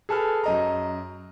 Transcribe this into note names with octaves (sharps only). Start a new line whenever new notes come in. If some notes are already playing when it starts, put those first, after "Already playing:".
G#4 A4 B4 F6
F#2 D#5 A#5